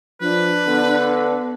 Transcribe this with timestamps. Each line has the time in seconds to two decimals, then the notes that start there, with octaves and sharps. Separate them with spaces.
0.21 F3 D4 B4
0.67 D3 B3